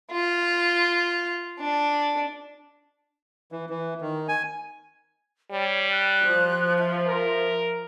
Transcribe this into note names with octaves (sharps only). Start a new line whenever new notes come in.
F4
D4
E3
E3
D#3
G#5
G3 C#5
F#6
F3
E5
A#4 E5